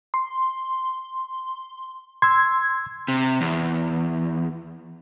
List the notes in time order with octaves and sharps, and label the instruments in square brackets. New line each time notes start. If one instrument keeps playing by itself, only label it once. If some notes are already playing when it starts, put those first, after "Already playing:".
[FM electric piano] C6
[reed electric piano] C6 E6 [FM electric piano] G#6
[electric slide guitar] C3
E2